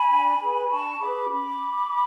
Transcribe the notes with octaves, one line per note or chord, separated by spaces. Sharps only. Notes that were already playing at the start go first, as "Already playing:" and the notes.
Already playing: G#5 B5
D4
G#4 B4
D4 A5 C#6
G#4 B4 B5 D6
C#4 B5 D6